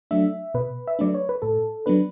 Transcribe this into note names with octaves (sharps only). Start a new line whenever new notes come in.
F#3 A3 D4 E5
B2 B4
E5
F#3 A3 D4 D5
C#5
B4
A2 A4
F#3 B3 D4 B4